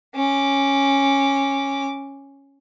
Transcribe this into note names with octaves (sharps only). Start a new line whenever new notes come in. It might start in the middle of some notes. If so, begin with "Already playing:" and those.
C#4 D6